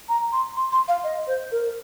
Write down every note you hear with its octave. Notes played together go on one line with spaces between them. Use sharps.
A#5
C6
C6
C6
F5
D#5
C5
A#4